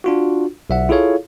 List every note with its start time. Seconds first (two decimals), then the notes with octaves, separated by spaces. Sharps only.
0.04 D4 F4 F#4
0.70 B1 E5 F#5
0.89 E4 F4 G#4 A4 C#5 F5